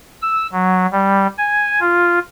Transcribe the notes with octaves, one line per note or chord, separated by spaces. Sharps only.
E6
F#3
G3
G#5
F4